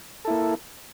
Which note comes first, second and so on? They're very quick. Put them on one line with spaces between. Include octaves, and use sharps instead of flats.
A4 E4 A#3